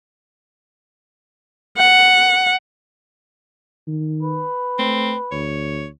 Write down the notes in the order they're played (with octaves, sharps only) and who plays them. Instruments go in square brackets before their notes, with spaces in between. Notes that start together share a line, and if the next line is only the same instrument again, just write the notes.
[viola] F#5
[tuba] D#3
[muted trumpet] B4
[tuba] A3 [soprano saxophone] C4
[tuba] D2 [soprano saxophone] C#5